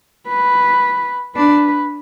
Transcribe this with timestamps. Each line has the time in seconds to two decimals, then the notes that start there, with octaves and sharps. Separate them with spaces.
0.28 B4
1.36 D4 B4